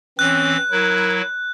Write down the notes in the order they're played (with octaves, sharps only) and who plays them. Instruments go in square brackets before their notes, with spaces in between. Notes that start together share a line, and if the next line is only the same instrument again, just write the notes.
[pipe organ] E3 C4 [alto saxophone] C#4 [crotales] F#6
[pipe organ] F#3 E4 [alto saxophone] A#4